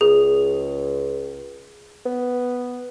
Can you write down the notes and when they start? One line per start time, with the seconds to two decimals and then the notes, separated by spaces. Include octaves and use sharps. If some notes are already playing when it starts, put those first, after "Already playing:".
0.01 C#2 G#4
2.05 B3